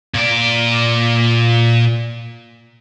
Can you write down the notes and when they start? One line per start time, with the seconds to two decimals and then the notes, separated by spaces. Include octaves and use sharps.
0.14 A#2 D5